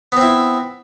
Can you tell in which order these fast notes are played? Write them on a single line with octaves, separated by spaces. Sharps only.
B3 C4 E4